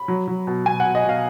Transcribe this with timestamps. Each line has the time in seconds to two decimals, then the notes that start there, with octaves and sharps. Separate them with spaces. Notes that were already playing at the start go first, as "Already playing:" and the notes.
Already playing: B5
0.08 F#3
0.28 F#3
0.47 B2
0.66 B2 G#5
0.80 B2 F#5
0.95 D#5
1.04 B2 F5